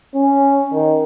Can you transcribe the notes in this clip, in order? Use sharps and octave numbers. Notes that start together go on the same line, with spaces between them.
C#4
D#3